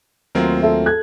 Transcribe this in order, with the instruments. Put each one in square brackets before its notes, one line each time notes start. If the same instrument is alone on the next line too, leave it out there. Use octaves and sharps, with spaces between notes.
[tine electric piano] D#2 A3 F4 [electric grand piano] F#3 C4 A#4
[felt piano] A4 E5
A4 F#6 G#6